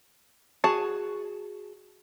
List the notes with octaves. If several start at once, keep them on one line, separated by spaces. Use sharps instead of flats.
F#4 G#4 A5